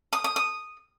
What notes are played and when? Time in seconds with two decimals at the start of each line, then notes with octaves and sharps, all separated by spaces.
0.13 D#6
0.24 D#6
0.36 D#6